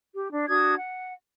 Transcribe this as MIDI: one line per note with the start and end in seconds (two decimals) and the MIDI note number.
0.14 0.28 67
0.31 0.46 62
0.48 0.75 62
0.48 0.75 66
0.48 0.75 87
0.48 0.75 92
0.76 1.13 78